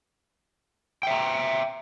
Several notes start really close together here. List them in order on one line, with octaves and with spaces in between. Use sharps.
G5 E5 A#5